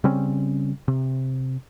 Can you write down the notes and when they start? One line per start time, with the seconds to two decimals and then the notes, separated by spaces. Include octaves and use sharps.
0.04 C#3 G3 C4 C#4
0.88 C3